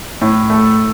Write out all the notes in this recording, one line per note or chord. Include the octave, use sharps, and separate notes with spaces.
A2
A3